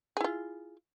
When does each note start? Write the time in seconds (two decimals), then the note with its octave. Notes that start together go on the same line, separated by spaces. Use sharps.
0.17 G#4
0.21 E4
0.24 F4